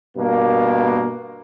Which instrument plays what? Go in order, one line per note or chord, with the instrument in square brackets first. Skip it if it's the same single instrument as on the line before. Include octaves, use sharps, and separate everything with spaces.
[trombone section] G2 B2 A#3